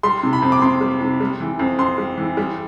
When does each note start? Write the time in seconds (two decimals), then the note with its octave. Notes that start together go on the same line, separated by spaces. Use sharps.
0.03 G3 C6
0.23 C3
0.33 B5
0.42 F2
0.52 D6
0.62 F2 C6
0.81 G3
1.01 C3
1.20 G3
1.40 E3
1.59 F2
1.78 F2 C6
1.98 G3
2.18 E3
2.37 G3